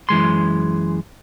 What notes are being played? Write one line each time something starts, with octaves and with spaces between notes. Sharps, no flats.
F#2 E3 G#3 C6